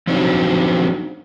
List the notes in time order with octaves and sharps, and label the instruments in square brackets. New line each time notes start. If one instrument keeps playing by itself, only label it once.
[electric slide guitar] F3 F#3 C4 D4 D#4 F#4